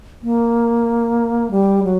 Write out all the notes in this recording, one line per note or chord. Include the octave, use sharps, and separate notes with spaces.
A#3
G3
F#3